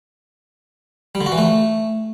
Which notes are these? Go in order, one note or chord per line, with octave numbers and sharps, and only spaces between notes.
G3
D3
F#4
E3
A3